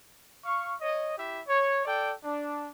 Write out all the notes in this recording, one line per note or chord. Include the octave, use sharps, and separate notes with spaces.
F5 C#6
C#5 D#5
E4 G4 E5
C#5
A4 D5 G5
D4